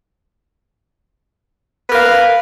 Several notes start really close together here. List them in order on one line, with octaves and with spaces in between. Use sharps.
B4 A#4 F5